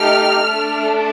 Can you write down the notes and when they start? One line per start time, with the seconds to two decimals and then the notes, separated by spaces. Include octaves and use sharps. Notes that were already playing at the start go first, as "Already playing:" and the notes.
Already playing: A3 D#4 G4 F6
0.45 A3 D4 A4